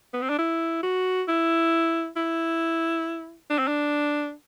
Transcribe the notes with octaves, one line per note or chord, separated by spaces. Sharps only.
B3
C4
D4
E4
F#4
E4
E4
D4
C4
D4